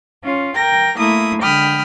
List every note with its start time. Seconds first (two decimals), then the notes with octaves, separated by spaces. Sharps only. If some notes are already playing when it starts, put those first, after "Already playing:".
0.24 C#4 F4
0.55 A#4 G5 A#6
0.98 A3 A#3 E4 D#6
1.41 D3 G#3 G5 B5 D#6 F6